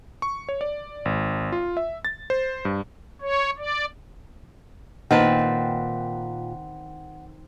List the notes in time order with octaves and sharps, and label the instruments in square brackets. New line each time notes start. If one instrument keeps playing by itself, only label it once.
[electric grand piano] C#6
C#5
D5
G#1
F4
E5
A6
C5
G2
[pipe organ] C#5
D5
[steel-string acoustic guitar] A#2 [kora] D#3 [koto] C4 B4 A5 [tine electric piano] F#5